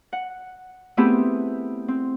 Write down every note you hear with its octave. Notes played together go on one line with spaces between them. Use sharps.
F#5
A3 B3 C4 E4 G4 G#4
C4